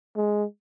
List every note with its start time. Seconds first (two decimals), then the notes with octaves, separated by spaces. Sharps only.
0.16 G#3